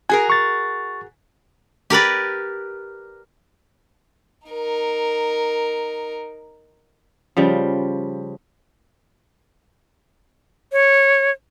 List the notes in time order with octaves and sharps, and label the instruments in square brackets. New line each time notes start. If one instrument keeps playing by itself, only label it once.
[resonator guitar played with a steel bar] F#4 G#4 A#4 [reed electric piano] G#5
[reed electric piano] C#6 A6
[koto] G4 A#4 B4 D5
[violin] D#4 A#4
[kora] C#3 F3 G3
[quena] C#5